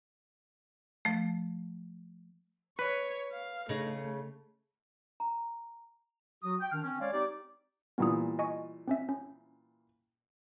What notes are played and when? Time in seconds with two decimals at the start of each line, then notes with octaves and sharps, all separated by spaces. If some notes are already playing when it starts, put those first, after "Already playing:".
1.05 F3 A3
2.79 B4 C#5
3.32 F5
3.69 C#3 A3 D#4
5.20 A#5
6.43 F#3 F#4 D#6
6.61 G5
6.72 D#3 D4 F6
6.84 C4 C#4
7.00 G#3 C#4 C#5 D5 F5
7.13 C4 D#4 G4 D5
7.98 A#2 E3 G3 B3 D#6
8.39 D#5 G#5 C#6
8.88 C4 C#4 E5
9.09 C#4